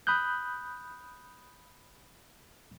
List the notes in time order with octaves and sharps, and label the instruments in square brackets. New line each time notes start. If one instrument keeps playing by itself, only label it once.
[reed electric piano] B5 D#6 F#6 G6